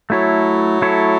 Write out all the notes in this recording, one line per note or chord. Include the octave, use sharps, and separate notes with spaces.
F#3 A3 E4 A4 C#5
A3 E4 A4 C#5